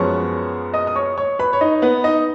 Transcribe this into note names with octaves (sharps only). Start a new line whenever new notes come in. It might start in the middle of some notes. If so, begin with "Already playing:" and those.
Already playing: F#2 F3 G#3 B3 C#5 C#6
D#5 D#6
D#6
C#5 C#6
C#5 C#6
B4 B5
C#5
D#4 D#5
B3 B4
D#4 D#5